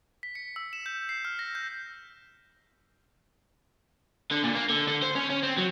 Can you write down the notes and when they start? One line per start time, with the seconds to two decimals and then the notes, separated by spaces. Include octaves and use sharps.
0.23 B6
0.35 C#7
0.56 E6
0.73 E7
0.86 G6
1.09 C7
1.25 F6
1.39 A#6
1.55 G6
4.31 D3
4.44 A#2
4.55 A#3
4.70 D3
4.88 D3
5.02 C5
5.15 C#4
5.30 C#4
5.43 C4
5.58 F#3